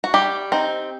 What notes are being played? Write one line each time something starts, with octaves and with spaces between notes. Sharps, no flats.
F#4
G3 G4
C4 D#4